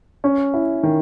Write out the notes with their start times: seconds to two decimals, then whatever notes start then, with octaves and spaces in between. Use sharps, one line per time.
0.24 C#4
0.54 E4
0.83 D#3